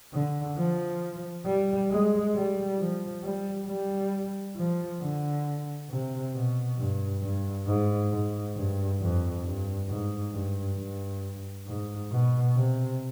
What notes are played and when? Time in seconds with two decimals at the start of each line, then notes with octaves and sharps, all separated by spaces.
0.13 D3
0.57 F3
1.46 G3
1.90 G#3
2.34 G3
2.79 F3
3.23 G3
3.68 G3
4.56 F3
5.01 D3
5.90 C3
6.34 B2
6.78 G2
7.22 G2
7.67 G#2
8.11 G#2
8.55 G2
9.01 F2
9.45 G2
9.89 G#2
10.34 G2
10.77 G2
11.67 G#2
12.11 B2
12.55 C3